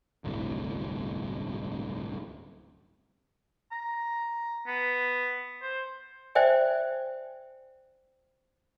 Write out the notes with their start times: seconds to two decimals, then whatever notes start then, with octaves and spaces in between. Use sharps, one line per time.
0.24 D1 G1 C2 A2
3.72 A#5
4.67 B3
5.62 C5
6.35 C5 D5 E5 G5 G#5